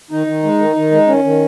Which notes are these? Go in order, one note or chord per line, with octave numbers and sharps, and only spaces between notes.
D#3 D#4
D#3
G#3
D#3
D#3
G#3
D#3 C#4
D#3